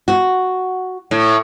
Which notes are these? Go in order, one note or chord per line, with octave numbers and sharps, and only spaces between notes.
F#4
A2